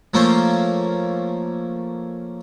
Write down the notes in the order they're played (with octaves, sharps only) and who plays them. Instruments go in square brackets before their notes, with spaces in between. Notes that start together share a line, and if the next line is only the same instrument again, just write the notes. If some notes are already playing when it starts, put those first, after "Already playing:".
[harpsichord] F3 A3 A#3 C#4 C5